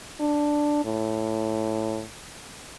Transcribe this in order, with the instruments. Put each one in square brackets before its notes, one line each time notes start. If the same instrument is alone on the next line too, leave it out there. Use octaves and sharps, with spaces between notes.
[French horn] D4
A2